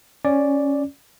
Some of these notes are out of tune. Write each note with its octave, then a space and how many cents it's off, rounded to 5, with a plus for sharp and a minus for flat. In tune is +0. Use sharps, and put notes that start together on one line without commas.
C#4 +0 D5 +0